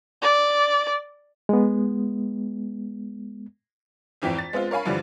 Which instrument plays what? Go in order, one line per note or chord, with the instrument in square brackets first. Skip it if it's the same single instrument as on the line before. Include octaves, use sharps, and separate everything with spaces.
[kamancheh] D5
[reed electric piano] G#3 B3
[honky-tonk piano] G#1 F2 E3 G5 B6
A6
G#3 B3 C4 F4
A#4 C#5 F5 G#5 B5
G2 D3 E3 F3 G3